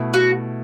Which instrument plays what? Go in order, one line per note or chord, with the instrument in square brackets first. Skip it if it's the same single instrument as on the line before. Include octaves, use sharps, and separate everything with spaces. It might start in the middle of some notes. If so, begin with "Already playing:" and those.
Already playing: [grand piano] B2 A3 E4
[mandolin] F#4